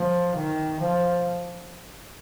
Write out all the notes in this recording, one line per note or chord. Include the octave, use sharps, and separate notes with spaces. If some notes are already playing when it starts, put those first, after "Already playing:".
Already playing: F3
D#3
F3